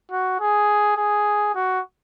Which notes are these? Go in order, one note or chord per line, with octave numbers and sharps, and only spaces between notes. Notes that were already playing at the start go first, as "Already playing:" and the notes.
F#4
G#4
G#4
F#4